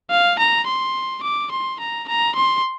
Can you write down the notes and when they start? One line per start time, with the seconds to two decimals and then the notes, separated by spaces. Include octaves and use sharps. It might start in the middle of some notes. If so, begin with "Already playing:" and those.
0.10 F5
0.39 A#5
0.67 C6
1.23 D6
1.51 C6
1.80 A#5
2.08 A#5
2.35 C6